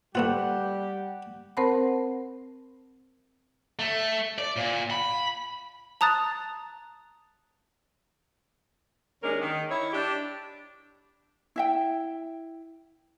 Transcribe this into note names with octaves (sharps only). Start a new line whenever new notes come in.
G3 A3 B3 F4 G4 F#5
C4 A#4 C5 F#5 A5 B5
A3
D5
A#2
B5
A5 A#5 D#6 F#6 A6
D#2 G#3 C#4 D4 A#4
D#3
E4 C#5
D4 G4
E4 E5 G5